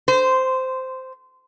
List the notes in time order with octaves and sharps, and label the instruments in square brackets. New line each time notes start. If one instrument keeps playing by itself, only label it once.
[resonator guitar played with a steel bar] C5